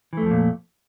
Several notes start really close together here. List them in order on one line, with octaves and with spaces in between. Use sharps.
E3 A3 F2 F3 A#2